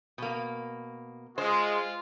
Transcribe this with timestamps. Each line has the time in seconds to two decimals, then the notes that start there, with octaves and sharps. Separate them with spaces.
0.18 B2 A#3
1.38 G#3 F4 C5